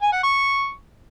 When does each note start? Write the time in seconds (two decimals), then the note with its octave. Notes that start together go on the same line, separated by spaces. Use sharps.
0.02 G#5
0.13 F#5
0.23 C#6